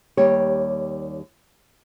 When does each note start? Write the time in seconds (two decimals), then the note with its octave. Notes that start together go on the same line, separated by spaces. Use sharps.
0.17 D#2 G3 G4 C#5